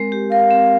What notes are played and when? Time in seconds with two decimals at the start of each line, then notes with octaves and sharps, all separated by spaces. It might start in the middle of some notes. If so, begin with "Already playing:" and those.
Already playing: G#3 C4 A#4
0.12 G4
0.31 A#4 F5
0.50 C4